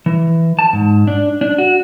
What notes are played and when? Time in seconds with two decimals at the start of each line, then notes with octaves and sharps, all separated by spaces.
0.06 E3
0.59 A5
0.73 G#2
1.07 D4
1.41 D4
1.58 F#4